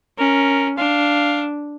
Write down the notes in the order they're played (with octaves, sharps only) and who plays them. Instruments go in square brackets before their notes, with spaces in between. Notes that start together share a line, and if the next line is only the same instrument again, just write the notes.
[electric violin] C#4 [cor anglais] A#4
[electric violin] D4 [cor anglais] F5